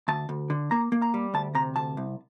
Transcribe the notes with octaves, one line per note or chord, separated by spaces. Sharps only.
D2 A5
D2
D3
A#3 A#5
A#3
A#5
G3
D2 A5
C3 A#5
D2 A5
C2